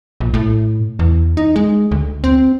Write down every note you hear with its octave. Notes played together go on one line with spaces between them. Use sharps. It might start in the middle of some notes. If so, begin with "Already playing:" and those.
A#1
A2
E2
D#4
G#3
D2
C4